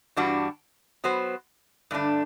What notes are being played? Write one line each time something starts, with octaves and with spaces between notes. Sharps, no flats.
G2 E3 G3 D4 F#4
F#3 B3 F#4 C5
G2 D3 A3 D4